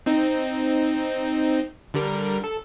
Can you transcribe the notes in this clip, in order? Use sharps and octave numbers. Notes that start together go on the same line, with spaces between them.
C4 D#4
D3 G3 A#4
A4